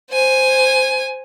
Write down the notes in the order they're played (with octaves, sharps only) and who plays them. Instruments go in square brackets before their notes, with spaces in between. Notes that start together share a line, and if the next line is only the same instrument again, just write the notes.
[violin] C5 G#5